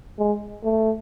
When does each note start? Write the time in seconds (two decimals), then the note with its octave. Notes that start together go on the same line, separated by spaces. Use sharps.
0.19 G#3
0.64 A3